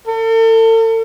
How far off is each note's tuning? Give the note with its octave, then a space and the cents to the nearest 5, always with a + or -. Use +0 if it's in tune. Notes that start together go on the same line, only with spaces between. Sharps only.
A4 +40